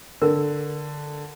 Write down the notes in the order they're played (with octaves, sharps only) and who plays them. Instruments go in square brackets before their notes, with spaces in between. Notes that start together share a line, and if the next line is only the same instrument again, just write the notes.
[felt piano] D3 [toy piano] A#4